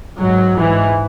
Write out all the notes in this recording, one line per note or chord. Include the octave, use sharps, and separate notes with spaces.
G#2 F#3
G#2 E3